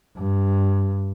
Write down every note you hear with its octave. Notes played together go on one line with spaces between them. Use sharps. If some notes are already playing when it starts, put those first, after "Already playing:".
G2